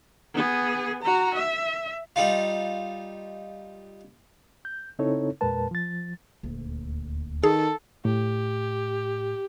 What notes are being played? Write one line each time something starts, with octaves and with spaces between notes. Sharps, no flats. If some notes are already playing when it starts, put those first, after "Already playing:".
B3 G#4
F#4 A#5
E5
G3 D#4 F4
G6
C#3 C4 D#4 E4 A4 C#5
E2 A#2 G#3 A#4 B4 A5
F3 A6
D#1 D2
D#3 G#4 A4
A2 G4